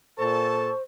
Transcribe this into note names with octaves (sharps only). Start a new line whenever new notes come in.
A#2 A4 C5 A5 C#6